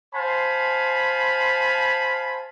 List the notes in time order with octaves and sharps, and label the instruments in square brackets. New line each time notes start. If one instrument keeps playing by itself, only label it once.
[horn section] C5 F5 G#5 A5 B5